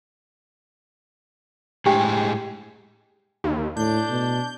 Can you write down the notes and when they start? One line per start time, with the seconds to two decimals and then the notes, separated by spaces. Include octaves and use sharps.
1.86 A2 G#3 D4 G4 G#4 G5
3.44 D#2
3.77 A2 D4 G6
4.10 B2